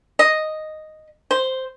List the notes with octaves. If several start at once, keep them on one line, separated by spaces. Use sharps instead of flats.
D#5
C5